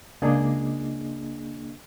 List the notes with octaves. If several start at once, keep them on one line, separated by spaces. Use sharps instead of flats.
C#2 A#3 D4 G#4 D#5